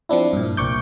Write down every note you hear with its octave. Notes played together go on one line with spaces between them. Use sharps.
F3 C4 D4 E4
G2 A#2
C2 A#2 C#6 D6 G6